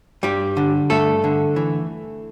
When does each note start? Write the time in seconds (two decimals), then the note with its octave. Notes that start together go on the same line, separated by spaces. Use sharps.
0.23 G2 G3 G4
0.57 D3
0.90 G2 A3 A4
1.24 D3
1.56 E3